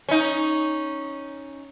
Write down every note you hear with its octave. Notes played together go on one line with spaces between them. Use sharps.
C#4 D#4